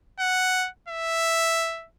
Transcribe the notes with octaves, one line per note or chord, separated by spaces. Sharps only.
F#5
E5